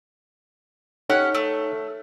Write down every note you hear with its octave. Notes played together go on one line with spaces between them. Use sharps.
C#4 D#4 G4 A4 C#5 F#5
A3